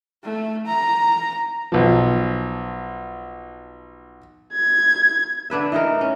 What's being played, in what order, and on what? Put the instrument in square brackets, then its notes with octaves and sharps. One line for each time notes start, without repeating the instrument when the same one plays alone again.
[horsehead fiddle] A3
A#5
[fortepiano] B1 F3
[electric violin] G#6
[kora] D3 D4 B4 E5
E3 A3 D#4 A#4
C#4